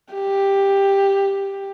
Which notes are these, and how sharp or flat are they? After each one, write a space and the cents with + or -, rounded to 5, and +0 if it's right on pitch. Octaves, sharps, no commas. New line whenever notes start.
G4 +10